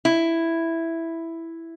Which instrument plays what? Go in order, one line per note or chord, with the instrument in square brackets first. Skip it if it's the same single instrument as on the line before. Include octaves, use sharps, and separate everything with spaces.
[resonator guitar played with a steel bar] E4